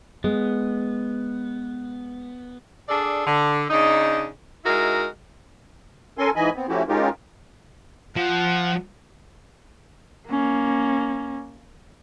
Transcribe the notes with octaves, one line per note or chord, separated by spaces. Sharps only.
G#3 B3
D4 G#4 A4 D5
D3
C#3 D4 D#4
G#3 D#4 E4 F#4 A#4
C#4 A4 A#4 G#5 C6
G#2 E3 D#5 G#5 B5
B3 C4
F3 A3 C#4 E4 F#4 G4
G#3 C#4 D#4 F4 G4 A#4
F3 F#5
A#3 C#4